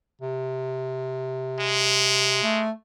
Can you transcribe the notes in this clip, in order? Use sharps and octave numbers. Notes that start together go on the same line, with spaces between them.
C3
G#3
A3